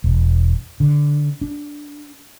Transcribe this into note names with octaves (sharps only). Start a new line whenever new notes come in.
E1
D3
D4